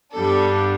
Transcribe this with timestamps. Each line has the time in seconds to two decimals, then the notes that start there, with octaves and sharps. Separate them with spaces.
0.15 G2 G3 B3 D4 A4